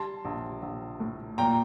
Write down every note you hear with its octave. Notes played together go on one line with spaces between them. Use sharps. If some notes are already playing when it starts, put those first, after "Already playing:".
Already playing: G3 A5 C6
A#1
A#1
A2
A#2 G5 A#5